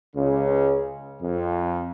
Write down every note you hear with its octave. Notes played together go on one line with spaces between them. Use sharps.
C#2 C#3
F2